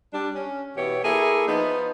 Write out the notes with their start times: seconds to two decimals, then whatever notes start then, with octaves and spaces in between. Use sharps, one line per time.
0.13 G3 D4
0.34 C#4
0.76 B2 E3 G4 C#5
1.04 A#3 E4 G#4 A4
1.47 F3 B3 D#4